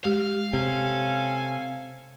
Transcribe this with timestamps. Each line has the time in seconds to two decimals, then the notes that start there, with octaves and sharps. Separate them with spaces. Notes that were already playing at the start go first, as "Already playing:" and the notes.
0.05 G#3 G4 F5
0.53 C3 C#4 A4 G#5